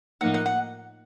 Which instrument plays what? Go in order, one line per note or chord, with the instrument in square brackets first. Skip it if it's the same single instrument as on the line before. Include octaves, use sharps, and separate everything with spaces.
[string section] A2 F3 A#3 D#4 [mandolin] F#5
[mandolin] F#5
F#5